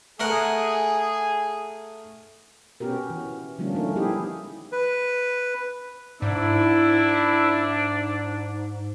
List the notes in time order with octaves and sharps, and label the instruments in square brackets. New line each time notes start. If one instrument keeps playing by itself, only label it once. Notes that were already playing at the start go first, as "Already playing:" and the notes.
[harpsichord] A3 A#4 F#5 [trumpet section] G#4
[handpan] B3 C#4 F#4 G4 A#4
E3
D3 F3 G3 A#3 C#4 D4
D#3 E3 A3 C#4 D#4 A#4
G#3 B3 D#4 E4 G4 G#4
[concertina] B4
[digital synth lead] G#2 [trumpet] D4 [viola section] E4